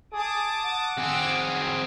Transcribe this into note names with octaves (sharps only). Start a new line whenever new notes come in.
G#4 A5 D6 D#6
F#5
C4 G#4 D6 E6
F#3